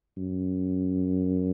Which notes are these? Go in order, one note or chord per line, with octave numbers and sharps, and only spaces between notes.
F#2